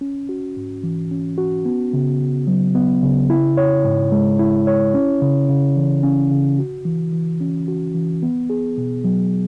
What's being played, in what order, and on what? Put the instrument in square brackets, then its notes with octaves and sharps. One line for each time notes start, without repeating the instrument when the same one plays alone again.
[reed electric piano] C#4
F#4
G#2
E3
C#4
F#4
B3
C#3
C#3
F#3
B3
C#3
E4
C#5
G#2
G#3
E4
C#5
C#4
C#3
C#3
E3
C#4
C#3
F#4
E3
E3
C#4
F#4
E3
B3
G#4
B2
F#3